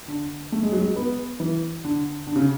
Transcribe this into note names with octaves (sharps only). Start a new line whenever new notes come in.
D3
A3
G#3
F#3
G#3
B3
E3
D3
D3
C#3